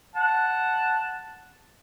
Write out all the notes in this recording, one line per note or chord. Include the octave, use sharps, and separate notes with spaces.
F#5 A5